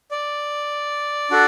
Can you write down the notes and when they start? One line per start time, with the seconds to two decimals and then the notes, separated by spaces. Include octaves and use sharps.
0.11 D5
1.31 D4 F#4 A4